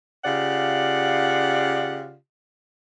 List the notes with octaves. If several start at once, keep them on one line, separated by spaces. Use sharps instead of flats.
C#3 F4 G4 D5 F#5